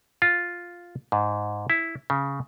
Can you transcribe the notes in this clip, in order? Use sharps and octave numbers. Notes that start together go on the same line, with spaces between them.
F4
G#2
E4
C#3